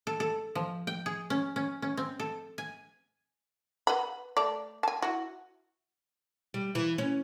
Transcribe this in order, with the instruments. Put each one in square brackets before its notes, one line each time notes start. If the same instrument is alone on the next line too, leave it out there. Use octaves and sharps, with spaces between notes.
[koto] A4
A4
F3
G5
G#4
C#4
C#4
C#4
C4
A4
G#5
[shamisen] B4 F#5 B5
A3 D5
G#5 A5
E4 F#4
[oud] G3
E3
C#4